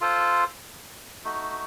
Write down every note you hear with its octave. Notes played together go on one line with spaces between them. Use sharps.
F4 A4 C5
A3 D#4 F#4